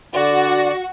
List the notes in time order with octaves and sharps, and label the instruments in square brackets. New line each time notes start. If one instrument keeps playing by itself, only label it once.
[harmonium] D3 D5 [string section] F#4